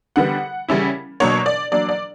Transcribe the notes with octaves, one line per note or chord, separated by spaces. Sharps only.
D3 G3 B3 F#5
C#3 G3 C#4 E4
B2 F#3 A#3 D4 C#5
D5
F#3 A#3 D4 D5
D5